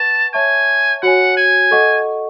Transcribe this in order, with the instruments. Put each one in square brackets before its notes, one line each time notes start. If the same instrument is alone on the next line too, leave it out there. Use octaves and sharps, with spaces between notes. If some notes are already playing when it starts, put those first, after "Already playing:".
Already playing: [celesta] B4 F#5 C#6 [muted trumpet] A5
[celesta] C#5 E5 A5 C#6 [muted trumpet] G#5
[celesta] F#4 C#5 G#5 [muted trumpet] F#5
[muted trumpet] G#5
[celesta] A4 D#5 F#5 C#6